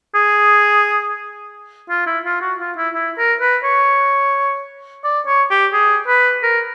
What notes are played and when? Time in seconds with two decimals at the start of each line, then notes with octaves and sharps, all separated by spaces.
0.15 G#4
1.90 F4
2.07 E4
2.25 F4
2.41 F#4
2.60 F4
2.77 E4
2.94 E4
3.18 A#4
3.41 B4
3.64 C#5
5.04 D5
5.26 C#5
5.51 G4
5.73 G#4
6.08 B4
6.43 A#4